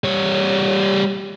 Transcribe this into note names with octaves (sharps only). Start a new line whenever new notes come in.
G3 C#5